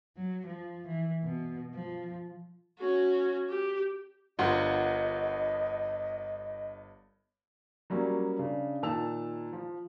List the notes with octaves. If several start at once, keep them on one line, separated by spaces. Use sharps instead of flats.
F#3
F3
E3
B2
F3
C#4 F#4
G4
G1 G2 F4 A#4 D#5 F#5
F#3 G3 A#3 C#4
C#3 D4
A#2 D#3 A5 E6 F7
F3